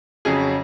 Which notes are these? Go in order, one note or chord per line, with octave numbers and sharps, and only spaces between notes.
F2 C#3 F#3 G#4